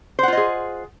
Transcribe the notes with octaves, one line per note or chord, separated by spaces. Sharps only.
F4 G#4 C5 D#5 F#5